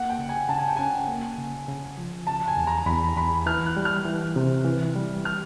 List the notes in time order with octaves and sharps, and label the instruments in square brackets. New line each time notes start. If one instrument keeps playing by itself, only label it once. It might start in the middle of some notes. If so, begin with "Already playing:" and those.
Already playing: [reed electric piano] A#3 [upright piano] F#5
[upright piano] G5
[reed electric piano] C#3
[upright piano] G#5
[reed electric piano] C#3 [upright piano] A5
[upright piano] G#5
G5
[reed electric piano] C#4 [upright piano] G#5
[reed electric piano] A#3
C#3
C#3
F3
[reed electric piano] C#3 [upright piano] A5
[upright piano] G#5
[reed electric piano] E2
[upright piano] A#5
[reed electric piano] E2 [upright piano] B5
[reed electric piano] E2 [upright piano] B5
[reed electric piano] E3 [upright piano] F6
[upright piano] F#6
[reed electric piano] G3
[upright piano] F6
[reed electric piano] E3
C3
E3
G3
[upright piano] F6